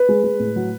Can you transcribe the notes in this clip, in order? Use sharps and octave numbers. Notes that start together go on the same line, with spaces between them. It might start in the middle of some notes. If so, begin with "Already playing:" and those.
Already playing: B4
G#3
G#3
A2
F#3